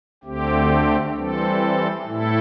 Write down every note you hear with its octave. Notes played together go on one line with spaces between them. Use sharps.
D2 D3 A3 C4 G4
E3 G3 C4 A4
A2 A3 E4 A4